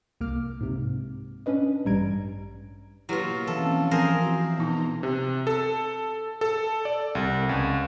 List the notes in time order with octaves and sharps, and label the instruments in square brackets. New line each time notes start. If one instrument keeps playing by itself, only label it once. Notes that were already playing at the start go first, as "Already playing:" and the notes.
[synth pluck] C2 A#3 D6 F6
G#2 C3
C#4 D4 B4 D#5
A1 G2 G3 A#5 G#6 D7
[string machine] B2 A#3 [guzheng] F#3 F4 [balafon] E4 G4 B4
[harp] E3 F3 [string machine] C4 C#4 [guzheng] A4
[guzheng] G#4 A#4 C5
[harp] C4 [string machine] E4 [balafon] F#4
[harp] B2 [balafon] B3 D#4 [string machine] A#5 C6
[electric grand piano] C3
A4
A4
D5
C2
C#2